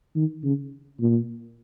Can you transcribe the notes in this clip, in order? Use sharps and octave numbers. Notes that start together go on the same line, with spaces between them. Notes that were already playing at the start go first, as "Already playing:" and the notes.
D#3
C#3
A#2